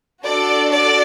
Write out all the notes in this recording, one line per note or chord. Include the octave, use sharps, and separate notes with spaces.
D4 F#4 A4 D5
D5